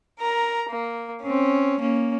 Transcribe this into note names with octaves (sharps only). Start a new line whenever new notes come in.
A#4 A#5
A#3
C4 C#4
A#3 C#4